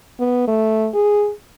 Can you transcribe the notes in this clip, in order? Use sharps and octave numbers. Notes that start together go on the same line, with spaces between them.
B3
A3
G#4